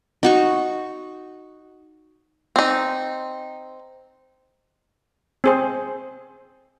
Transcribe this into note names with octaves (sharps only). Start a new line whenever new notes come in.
D#4 F#4 C#6
C4 D#4
C4 G#4 C5